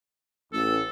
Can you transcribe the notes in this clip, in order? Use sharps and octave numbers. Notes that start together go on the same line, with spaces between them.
A1 A4